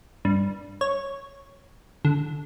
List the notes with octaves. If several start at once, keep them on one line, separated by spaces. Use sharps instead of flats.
G2
C#5
D3